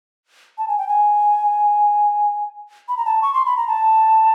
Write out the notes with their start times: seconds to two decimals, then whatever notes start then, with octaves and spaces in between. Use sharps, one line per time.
0.58 A5
0.68 G#5
0.78 G5
0.88 G#5
2.88 B5
2.97 A#5
3.05 A5
3.22 C#6
3.34 C6
3.45 B5
3.57 A#5
3.68 A5